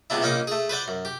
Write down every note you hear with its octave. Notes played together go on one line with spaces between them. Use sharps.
C#2 C3 B3 D4 E4
A#1 A#3 C#4 D#4 D6
A3 G#4
B4 C5 D5 F#5
F#2
G4